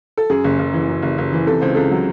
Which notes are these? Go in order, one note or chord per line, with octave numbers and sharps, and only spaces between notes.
A4
F#2 G#4
F#1
F#1
E3
F#2
F#1
F#1
E3
C3 A4
C#2 C5
C#2 A4
F#3